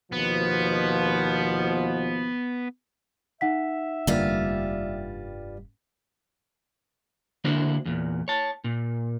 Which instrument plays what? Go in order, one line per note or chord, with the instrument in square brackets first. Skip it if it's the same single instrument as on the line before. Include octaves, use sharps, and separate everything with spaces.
[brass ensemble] D#2 B2 F3 [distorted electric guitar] B3
[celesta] D#4 F#5 B6 [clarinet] E5
[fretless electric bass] F1 D3 A#3 [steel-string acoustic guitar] G2 G3 F4
[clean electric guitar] D3 A#3 D4 E4 F#4 C5
E2 A#2
C#5 A5
A#2